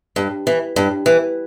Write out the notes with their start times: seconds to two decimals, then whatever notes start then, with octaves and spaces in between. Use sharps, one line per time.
0.16 G2
0.47 E3
0.76 G2
1.06 E3